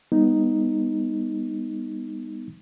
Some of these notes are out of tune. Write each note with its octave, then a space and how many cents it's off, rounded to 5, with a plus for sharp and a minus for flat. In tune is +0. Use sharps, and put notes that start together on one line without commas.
G3 +40 B3 +0 D#4 +0